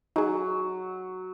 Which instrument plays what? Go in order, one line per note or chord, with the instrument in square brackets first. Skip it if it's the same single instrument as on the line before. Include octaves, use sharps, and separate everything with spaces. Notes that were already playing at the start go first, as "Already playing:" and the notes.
[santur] F#3 [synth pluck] D#4 G#4